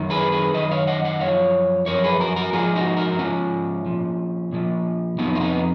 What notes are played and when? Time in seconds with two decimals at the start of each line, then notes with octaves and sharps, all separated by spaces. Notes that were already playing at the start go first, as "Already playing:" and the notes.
Already playing: F#2 D#3
0.10 G#4 B4
0.32 G#4 B4
0.54 F#2 D#3 B4 D#5
0.71 C#5 F5
0.87 D#5 F#5
1.04 D#5 F#5
1.20 F#2 F3 C#5 F5
1.86 F#2 F3 A#4 C#5
2.03 G#4 B4
2.20 F#4 A#4
2.36 F#4 A#4
2.53 G#2 F3 F4 G#4
2.75 D#4 F#4
2.97 F#4 A#4
3.19 G#2 F3 C#4 F4
3.86 A#2 F3
4.52 A#2 F3
5.18 F2 F3 B3 D#4
5.35 F4
5.40 B3 D#4